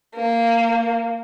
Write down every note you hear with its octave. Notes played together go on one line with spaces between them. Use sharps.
A#3